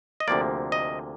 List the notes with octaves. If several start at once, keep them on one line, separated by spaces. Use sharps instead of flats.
D#5
D2 C3 F3 A#3 D5
D#5